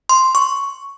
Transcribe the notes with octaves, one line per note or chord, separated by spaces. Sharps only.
C6
C#6